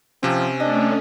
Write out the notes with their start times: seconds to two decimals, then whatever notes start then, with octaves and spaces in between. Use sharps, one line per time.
0.23 C3 F3 C4 C#4
0.60 A3 C#4 D4 D#5